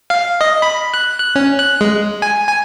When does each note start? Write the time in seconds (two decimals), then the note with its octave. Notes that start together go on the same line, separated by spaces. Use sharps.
0.10 F5
0.41 D#5
0.62 B5
0.94 F#6
1.19 F#6
1.35 C#4
1.59 F#6
1.81 G#3
2.22 G#5
2.48 G#5